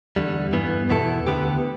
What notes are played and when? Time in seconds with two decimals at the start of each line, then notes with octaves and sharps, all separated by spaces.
0.16 E2 D3 G3
0.53 G2 E3 B3
0.90 E2 B2 B3 E4 A4
1.27 D2 D3 B3 G4 B4